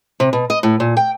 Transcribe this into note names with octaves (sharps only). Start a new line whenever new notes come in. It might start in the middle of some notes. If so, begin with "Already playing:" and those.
C3
B2
D#5
A2
A#2
G5